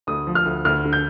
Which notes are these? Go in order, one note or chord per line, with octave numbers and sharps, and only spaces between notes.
D2 D#6
F3
F6
D2
D2 F6
D3
G6